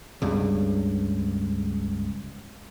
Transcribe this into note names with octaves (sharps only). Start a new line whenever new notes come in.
C#2 G2